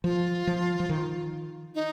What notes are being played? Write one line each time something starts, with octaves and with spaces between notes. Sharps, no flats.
F3 F4
F3
F3
D#3
D#4